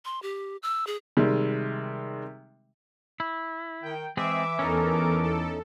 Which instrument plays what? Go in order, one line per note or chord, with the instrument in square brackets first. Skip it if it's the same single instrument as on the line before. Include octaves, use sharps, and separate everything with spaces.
[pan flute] C6
G4
E6
G#4
[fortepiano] C3 D#3 G3 G#3
[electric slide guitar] E4
[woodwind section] D#3 G5
[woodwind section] E3 D6 [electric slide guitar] G#3 C4 G#4 [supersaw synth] E5
[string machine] E2 [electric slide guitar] C#4 D#4 [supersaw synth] A4 A#4
[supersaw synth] A4